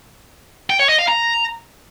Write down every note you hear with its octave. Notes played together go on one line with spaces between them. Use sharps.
G5
C#5
D#5
F5
A#5